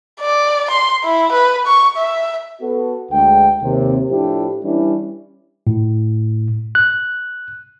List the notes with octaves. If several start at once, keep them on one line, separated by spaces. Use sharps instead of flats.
D5
C6
E4
B4
C#6
E5
B3 F#4 A4
D2 G#3 G5
D#2 C3
A2 F3 D4 E4 G4
E3 G3 C#4 D4 E4
A2
F#6